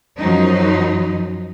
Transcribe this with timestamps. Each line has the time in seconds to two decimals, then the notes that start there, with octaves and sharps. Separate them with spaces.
0.19 F#2 F3 F#3 D#4